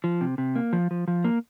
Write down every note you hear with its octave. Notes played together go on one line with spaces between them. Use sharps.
F3
C3
C3
A#3
F3
F3
F3
A#3